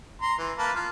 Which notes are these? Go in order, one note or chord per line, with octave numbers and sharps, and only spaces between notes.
A#5 C6
E3
A#3 B4 A5
F4